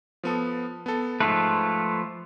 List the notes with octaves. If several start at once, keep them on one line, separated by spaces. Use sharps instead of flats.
F3 B3 A4
B3 A4
G#2 F3 A3 F4 B4